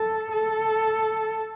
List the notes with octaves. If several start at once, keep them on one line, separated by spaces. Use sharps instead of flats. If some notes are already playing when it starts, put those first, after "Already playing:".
Already playing: A4
A4